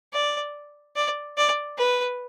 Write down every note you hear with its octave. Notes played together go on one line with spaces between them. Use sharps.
D5
D5
D5
B4